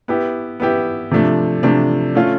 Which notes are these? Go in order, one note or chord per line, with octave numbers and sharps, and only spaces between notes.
B3 E4 G4
B3 E4 G4
C3 F3 A3 D4
C3 F3 A3 D4
A3 C#4 F4